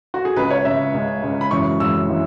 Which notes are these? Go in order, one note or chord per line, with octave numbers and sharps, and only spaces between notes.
F#4
G#4
C#2 C#3 G#3 B4
C#5
C#2 C#3 G#3 E5
C#2 C#3 G#3
C#2 C#3 G#3
B5
F#2 C#3 E3 G#3 C#6
F#2 C#3 E3 G#3 E6
C#3 E3 G#3